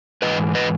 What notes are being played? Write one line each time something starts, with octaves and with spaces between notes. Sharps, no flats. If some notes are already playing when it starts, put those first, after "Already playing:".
G#2 E3 B4 D#5
B4 D#5